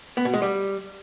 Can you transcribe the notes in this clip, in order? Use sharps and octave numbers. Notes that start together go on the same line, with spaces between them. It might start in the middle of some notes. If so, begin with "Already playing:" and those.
B3
B2
G#3
G3